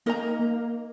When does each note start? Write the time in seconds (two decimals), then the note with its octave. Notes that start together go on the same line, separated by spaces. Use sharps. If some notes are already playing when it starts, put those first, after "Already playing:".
0.06 A#3 D#4 A#4 D#5 A#5
0.39 A#3